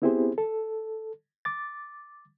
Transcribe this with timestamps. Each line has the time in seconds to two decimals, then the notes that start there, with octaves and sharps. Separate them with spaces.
0.02 B3 C4 E4 G4 G#4 C5
0.38 A4
1.45 D6 A6